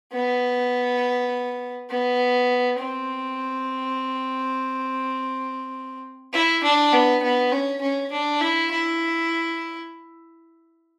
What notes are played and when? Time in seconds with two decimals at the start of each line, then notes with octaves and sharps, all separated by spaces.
0.13 B3
1.90 B3
2.79 C4
6.34 E4
6.64 D4
6.93 B3
7.23 B3
7.52 C#4
7.82 C#4
8.12 D4
8.41 E4
8.71 E4